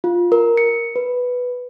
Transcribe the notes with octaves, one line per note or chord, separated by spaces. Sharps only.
F4
A#4
C#7
B4